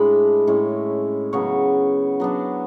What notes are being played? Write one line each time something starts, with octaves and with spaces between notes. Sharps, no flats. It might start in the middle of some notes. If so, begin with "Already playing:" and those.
Already playing: A2 G#3 D4 B5
A2 G#3 C#4 E4
C#3 F#3 B3 C#5
F#3 B3 D4